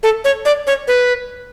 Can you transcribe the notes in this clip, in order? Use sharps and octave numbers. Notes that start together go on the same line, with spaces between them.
A4
C#5
D5
C#5
B4